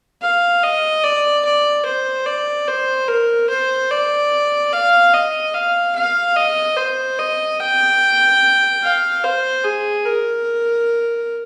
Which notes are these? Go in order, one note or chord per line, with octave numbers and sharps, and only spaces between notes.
F5
D#5
D5
D5
C5
D5
C5
A#4
C5
D5
F5
D#5
F5
F5
D#5
C5
D#5
G5
F5
C5
G#4
A#4